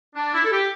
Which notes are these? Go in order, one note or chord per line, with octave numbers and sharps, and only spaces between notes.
D4
E4
A4
G4